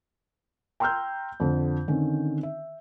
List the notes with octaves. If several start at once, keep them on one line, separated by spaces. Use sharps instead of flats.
G5 A#5 C6 E6 F6 G6
F2 D3 F3
D3 D#3 C4 C#4
E5